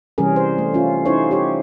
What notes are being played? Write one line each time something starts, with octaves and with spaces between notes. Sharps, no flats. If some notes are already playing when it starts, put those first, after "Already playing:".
C3 E3 G3 C#4 G#4 A#4
C5
A3
C#4 F4
C#4 D#4 E4 C5 C#5
G4 C#5